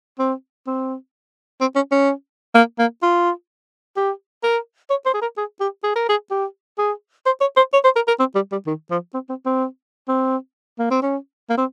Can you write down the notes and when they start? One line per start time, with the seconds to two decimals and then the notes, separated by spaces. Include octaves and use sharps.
0.19 C4
0.67 C4
1.61 C4
1.75 C#4
1.92 C#4
2.55 A#3
2.79 A#3
3.02 F4
3.96 G4
4.43 A#4
4.90 C#5
5.06 C5
5.14 G#4
5.22 A#4
5.37 G#4
5.60 G4
5.84 G#4
5.96 A#4
6.09 G#4
6.31 G4
6.78 G#4
7.26 C5
7.41 C#5
7.57 C5
7.73 C#5
7.84 C5
7.96 A#4
8.08 A#4
8.19 C4
8.35 G3
8.52 G3
8.66 D#3
8.90 F3
9.14 C4
9.29 C4
9.46 C4
10.08 C4
10.79 A#3
10.91 C4
11.02 C#4
11.49 A#3
11.57 C4